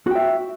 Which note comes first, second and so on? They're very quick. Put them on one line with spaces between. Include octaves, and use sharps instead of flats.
F#4 G5 E5